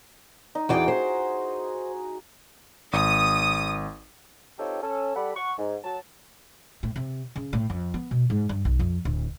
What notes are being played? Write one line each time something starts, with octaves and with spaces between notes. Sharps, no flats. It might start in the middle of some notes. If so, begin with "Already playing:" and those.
D#4
E2 F#4 G#4 D5 G5
C5
G#1 D#6
C4 D#4 F4 G4 A4 C#5
C#4 A4
G3 A4 D5 F#5 B5
F#5 C#6
G#2
F#3 A5
A2
C3
C#3
A2
F2
B3
B2
G#2
G2
B1
F2
D1